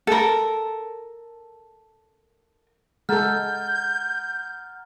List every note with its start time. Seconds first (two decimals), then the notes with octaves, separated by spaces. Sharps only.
0.07 A4 A#4
3.09 G#3 A4 F#5 A#5 F6 G6 A6